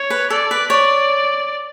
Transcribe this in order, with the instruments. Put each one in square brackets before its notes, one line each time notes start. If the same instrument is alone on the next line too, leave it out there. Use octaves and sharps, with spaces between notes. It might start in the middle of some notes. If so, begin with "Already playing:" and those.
Already playing: [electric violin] C#5
[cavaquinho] B4
[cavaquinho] A4 [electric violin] D5
[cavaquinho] B4
[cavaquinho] C#5 [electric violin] D5